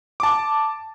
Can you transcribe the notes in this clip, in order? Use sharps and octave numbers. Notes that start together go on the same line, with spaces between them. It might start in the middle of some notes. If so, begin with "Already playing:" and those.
A5 D6